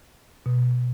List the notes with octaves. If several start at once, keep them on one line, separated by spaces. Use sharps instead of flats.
B2